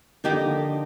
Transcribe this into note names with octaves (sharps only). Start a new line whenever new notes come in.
D#3 F3 A#3 D#4 G4
D3
D3